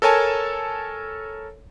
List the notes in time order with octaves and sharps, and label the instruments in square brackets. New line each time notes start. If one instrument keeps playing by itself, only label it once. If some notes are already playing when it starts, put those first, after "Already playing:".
[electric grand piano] A4 A#4 C#5 G#5 A5